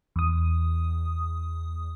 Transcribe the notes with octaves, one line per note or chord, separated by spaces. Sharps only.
E2 D#6